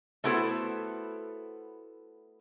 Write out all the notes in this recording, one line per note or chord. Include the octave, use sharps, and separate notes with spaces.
A3 B3 E4 F#4 A4 C5